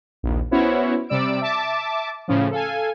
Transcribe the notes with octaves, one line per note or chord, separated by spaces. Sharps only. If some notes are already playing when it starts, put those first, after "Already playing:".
A#1 D#2
B3 C#4 E4 F#4 C5 C#5
C3 G3 D5 E6 D7
E5 A5 D6 A6
A2 C#3 F3
A4 F5 G#5